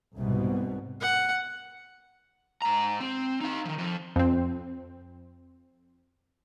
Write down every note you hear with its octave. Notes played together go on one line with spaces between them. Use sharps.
C2 G#2 B2
F#5
G#2 A#5
C4
D#4 F5
D#3 F3
F2 F3
F2 C4